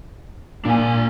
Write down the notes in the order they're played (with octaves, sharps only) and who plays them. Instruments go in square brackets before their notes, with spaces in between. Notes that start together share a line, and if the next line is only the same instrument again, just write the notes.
[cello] A#2 [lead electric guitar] D4 G#5